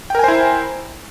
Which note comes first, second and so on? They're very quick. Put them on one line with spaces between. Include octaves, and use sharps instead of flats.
G5 A#4 G#5 C5 E4